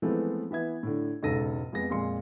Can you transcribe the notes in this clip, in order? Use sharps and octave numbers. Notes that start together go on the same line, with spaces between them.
E3 F3 G#3 A3 B3 C4
E3 B3 E5 G#6
A2 D3
E1 G#2 C#3 A4 A#6 D#7
F2 G#3 B3 A#6
F2 A#2 G#3 C6 C#7